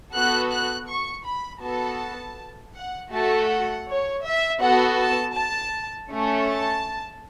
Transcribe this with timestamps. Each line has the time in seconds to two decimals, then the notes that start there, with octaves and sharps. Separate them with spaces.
0.13 B3 F#4 A4 F#6
0.51 F#6
0.88 C#6
1.25 B5
1.62 B3 F#4 A4 A5
2.74 F#5
3.12 A3 F#4 A4 A5
3.49 F#5
3.87 C#5
4.24 E5
4.61 B3 F#4 A4 F#5
4.99 A5
5.35 A5
6.11 A3 C#4 A4
6.48 A5